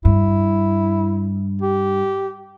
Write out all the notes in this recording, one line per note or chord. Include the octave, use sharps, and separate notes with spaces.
G2 E4
G4